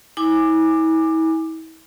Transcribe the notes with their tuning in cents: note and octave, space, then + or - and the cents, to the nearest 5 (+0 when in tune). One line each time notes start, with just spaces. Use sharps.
E4 -40 G#5 -10 D6 +15